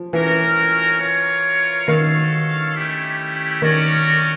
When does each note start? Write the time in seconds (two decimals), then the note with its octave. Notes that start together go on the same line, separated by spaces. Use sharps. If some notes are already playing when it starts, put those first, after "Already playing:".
Already playing: F3
0.13 E3 C#4 F#4 A#4
1.01 F4 A#4 C#5
1.88 D#3 F#4 A4 C#5 F5
2.75 A3 C#4 E4 G4
3.62 D#3 C#4 F#4 A#4 D5